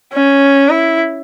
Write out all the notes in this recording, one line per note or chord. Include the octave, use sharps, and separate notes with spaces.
C#4
E4